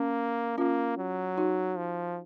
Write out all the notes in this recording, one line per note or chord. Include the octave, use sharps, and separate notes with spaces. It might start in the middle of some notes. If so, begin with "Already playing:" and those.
Already playing: A#3 C#4
A#3 C#4 F4
F#3
D#4 F#4
F3